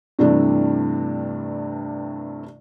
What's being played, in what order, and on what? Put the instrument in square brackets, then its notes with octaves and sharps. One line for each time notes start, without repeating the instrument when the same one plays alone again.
[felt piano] G2 C3 E3 G3 A3 D4